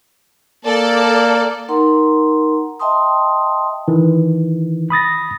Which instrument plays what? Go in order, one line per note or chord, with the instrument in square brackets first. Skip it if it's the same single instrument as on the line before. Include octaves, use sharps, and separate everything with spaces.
[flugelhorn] A#3 [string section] A4 D5
[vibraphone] D#4 A#4 F#5 A#5 C6
D#5 E5 G5 A5 C6 D#6
[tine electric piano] D#3 E3
B5 D#6 A6 A#6